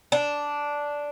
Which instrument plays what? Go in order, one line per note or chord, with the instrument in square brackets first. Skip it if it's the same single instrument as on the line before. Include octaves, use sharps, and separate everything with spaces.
[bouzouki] D4